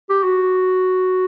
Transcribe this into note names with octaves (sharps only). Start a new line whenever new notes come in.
G4
F#4